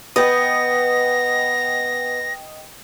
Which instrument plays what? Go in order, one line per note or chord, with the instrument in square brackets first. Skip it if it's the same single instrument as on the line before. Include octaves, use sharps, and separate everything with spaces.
[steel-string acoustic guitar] B3 [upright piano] B4 [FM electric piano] D#5 G5 D#6 [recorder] A#6